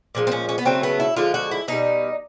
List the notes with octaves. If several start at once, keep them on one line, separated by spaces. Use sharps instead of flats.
A#2 F3 G#3
C4
C#4
C#4
B3
C#3 F#3 A3 C4
B3
E4
D3 F3 G#3 F4
F#4
E4
B2 G3 D#4